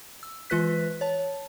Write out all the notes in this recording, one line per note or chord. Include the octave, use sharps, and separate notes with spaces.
E6
E3 G#3 F4 B4 F#6 B6
C#5 A5